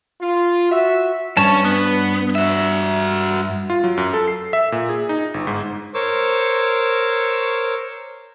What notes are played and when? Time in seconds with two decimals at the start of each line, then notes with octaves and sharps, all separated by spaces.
0.20 F4
0.71 F#4 E5
1.37 G2 C#4 C#5 A5
1.65 B3
2.35 F#4 E5
3.70 F4
3.84 F#3
3.97 F#2
4.13 A4
4.28 C7
4.53 E5
4.72 A#2
4.89 G#4
5.09 D#4
5.34 G1
5.47 G#2
5.94 A#4 C5 C#5 C#6 D6 E6